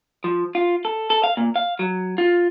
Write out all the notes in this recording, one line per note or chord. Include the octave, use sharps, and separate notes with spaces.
F3
F4
A4
A4
F5
A#2
F5
F#3
F4